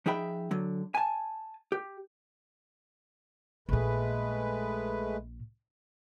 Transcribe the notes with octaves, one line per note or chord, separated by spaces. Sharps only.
F3 D#4 G#4 E5 G5 B5
D3 F#3
G#5 A5
G4
A#1 A#2 G#3 A3 B4